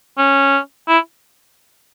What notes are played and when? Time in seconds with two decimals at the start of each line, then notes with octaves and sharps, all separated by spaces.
0.18 C#4
0.88 E4